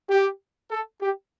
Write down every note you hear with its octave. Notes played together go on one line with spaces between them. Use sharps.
G4
A4
G4